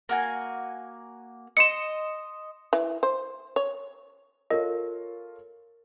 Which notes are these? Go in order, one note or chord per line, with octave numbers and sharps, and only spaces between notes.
A#3 F#4 G#5
D#5 C6 C#7 E7
E3
C5
C#5
F4 A4 A#4 C#5 D#5